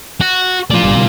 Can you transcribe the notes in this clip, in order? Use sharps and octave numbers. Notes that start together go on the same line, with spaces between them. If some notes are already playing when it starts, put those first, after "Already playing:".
F#4
A2 F3 F4 D5
G1 G3
B2 D3 G3